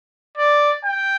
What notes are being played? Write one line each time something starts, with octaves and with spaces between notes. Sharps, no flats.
D5
G5